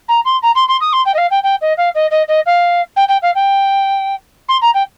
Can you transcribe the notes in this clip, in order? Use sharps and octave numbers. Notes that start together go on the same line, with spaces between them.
A#5
C6
A#5
C6
C6
D#6
C6
G5
D#5
F5
G5
G5
D#5
F5
D#5
D#5
D#5
F5
G5
G5
F5
G5
C6
A#5
G5